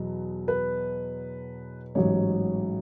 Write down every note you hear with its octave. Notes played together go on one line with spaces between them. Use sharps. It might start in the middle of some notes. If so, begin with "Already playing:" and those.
Already playing: E2 B2 F#3
B4
A1 G#2 F#3 C#5